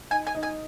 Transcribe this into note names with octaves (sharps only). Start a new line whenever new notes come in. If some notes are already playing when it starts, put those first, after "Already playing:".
D#4 G#5
G#5
D#4
G#5